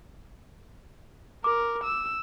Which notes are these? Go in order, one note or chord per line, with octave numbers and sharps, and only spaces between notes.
A#4 D6
E6